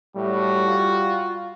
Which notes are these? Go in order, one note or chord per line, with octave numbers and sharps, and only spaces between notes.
A2 G3 F#4
F4